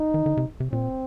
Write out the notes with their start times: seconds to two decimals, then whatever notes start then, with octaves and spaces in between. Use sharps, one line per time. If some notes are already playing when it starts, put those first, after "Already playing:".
Already playing: D#4
0.14 D#3
0.26 D3
0.37 C3
0.60 C3
0.72 A#2 C4